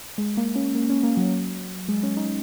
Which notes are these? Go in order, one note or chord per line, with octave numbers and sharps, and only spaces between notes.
G#3
A#3
C#4
A#3
C#4
A#3
F#3
G#3
C#4
D#4